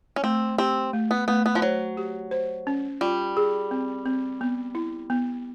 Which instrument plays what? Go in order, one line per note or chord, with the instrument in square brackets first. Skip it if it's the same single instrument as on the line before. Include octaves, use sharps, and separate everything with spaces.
[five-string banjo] C#4
[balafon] A3 [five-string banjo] C4
[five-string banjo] C4 [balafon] G4
[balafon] A3
[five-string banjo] B3
[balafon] A3 [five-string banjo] B3
[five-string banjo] B3
F3
[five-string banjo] F#3 [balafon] C5
[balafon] G4
C5
C#4
[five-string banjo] G3 [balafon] F4
[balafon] G#4
C4
C4
B3
E4
B3